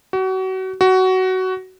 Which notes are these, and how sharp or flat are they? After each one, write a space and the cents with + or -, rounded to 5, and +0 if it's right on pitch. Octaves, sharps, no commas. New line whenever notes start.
F#4 +30
F#4 +15